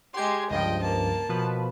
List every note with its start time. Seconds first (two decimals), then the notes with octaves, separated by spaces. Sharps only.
0.14 G#3 G4 C6 G#6
0.50 C#2 G2 F3 D#5 G5
0.81 A#3 A5
1.29 B2 F3 B4